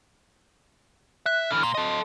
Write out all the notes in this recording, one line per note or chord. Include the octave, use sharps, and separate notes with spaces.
E5 F#6
D3 E3 F6
A#2 C6
A4 D#5